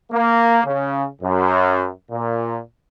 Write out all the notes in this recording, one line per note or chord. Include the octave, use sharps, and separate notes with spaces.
A#3
C#3
F#2
A#2